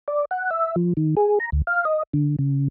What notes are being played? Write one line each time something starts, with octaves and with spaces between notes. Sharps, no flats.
D5
F#5
E5
F3
D#3
G#4
A#5
D2
F5
D#5
D3
C#3